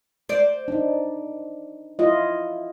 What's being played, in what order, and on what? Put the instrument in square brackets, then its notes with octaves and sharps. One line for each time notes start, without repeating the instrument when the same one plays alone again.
[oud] C5 D5
[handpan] D4 D#4
E4 F4 D#5